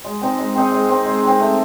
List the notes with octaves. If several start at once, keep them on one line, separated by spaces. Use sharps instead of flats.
G#3
C4 D#4
G#3
C4 D#4
G#3
C4 D#4
G#3
C4 D#4
A3